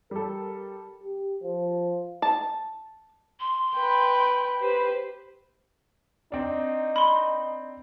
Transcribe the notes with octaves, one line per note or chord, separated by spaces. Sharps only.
G3 A4 A#4
G4
F3
A5
C6
B4 G5
G4 B4 C5
C4 D4 D#4
B5 C6